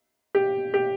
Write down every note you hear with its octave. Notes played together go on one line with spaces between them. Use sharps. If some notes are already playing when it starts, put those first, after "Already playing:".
G4
G4